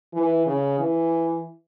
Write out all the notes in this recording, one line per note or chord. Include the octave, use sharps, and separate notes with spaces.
E3
C#3
E3